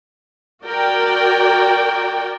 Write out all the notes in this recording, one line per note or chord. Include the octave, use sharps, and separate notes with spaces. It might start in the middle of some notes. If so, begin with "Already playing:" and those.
F#4 A#4 D5 G5